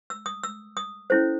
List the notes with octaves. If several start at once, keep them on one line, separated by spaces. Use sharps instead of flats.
E6
D#6
E6
D#6
C#4 E4 A4 C5